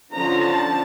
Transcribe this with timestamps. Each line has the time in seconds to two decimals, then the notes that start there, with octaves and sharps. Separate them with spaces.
0.12 D3 F3 C#4 A#5
0.41 A5